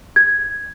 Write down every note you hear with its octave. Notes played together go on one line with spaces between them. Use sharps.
G#6